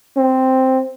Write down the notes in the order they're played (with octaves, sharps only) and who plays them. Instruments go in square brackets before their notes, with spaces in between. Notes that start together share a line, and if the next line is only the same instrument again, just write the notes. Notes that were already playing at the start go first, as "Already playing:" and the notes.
[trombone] C4